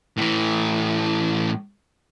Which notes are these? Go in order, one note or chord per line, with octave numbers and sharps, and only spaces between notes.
A2 E3